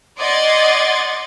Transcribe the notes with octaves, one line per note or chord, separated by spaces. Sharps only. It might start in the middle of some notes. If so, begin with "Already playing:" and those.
D5 D#5 F#5 C6 G#6 A6